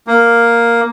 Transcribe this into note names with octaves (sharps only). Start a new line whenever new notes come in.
A#3